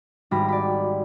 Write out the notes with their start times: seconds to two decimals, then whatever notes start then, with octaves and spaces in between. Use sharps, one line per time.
0.31 G#1 G3 F#4 B5 A#6
0.49 D5 B5